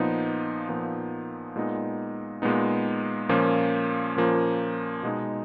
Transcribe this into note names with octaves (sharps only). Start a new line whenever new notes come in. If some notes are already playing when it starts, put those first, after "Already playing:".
Already playing: A#2 F3 B3 D#4
A#2 F3 B3 D#4
A#2 G#3 B3 D#4
A#2 G#3 B3 D#4
A#2 F3 A#3 C#4
A#2 F3 A#3 C#4
B2 G#3 D#4